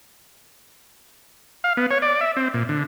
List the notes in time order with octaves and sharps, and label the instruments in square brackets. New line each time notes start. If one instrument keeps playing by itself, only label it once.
[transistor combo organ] F5
B3
C#5
D5
E5
C4
A#2
D3